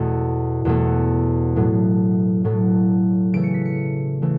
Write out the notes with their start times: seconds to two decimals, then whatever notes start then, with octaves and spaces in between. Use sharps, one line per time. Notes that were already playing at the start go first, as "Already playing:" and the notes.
Already playing: E2 B2 A3
0.65 E2 B2 A3
1.56 A2 F#3 A3
2.44 A2 F#3 A3
3.33 C#3 E3 A3 D7
3.44 C#7
3.54 B6
3.65 C#7
4.22 C#3 E3 A3